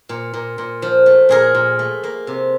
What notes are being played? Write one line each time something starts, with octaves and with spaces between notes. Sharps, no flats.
A#2
A#2
A#2
F3
A3
A#2 G#4 A#4
A#2
A3
A#3
C3